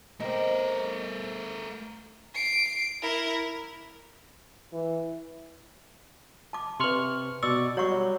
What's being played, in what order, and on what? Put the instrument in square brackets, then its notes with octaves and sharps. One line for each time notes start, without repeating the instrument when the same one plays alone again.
[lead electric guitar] A3 A#4 [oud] C4 D#4
[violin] C7 D7
E4 A#4
[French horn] E3
[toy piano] A5 D6
[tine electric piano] C3 C#6 F6 [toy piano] B4 C6
[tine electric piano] B2 D5 C#6 [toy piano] E6
[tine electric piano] F#3 G3 [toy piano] C#5 F#5 C#6